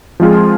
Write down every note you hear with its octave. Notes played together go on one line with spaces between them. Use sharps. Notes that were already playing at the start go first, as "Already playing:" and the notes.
F3 G#3 C4 F4 G#4